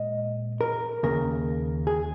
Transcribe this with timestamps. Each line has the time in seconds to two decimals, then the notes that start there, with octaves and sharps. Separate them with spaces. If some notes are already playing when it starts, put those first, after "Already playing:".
Already playing: A#2 G#3 D#5
0.61 A#4
1.03 D#2 C#3 A#3 A#4
1.87 G#4